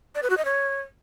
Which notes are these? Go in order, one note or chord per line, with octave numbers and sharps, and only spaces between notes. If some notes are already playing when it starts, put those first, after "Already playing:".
D5
B4
F#4
D#5
C#5